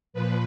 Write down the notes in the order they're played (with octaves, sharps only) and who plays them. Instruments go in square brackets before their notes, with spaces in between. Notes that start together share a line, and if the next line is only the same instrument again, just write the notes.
[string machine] A#2 F3 B4